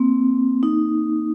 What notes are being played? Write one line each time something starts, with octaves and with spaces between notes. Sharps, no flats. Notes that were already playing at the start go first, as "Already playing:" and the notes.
Already playing: A#3 C4
D#4